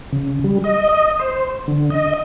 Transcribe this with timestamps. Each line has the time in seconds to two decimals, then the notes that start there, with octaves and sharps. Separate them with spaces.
0.12 C#3
0.44 G3
0.64 D#5
0.89 D#5
1.20 C5
1.68 D3
1.90 D#5